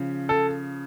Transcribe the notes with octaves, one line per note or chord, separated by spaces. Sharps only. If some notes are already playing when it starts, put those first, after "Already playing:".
Already playing: C#3 F3
A4